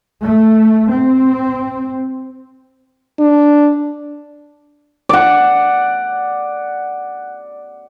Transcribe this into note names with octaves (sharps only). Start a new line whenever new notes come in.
A3
C4
D4
D5 F#5